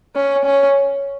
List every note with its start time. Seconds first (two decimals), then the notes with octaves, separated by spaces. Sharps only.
0.15 C#4
0.45 C#4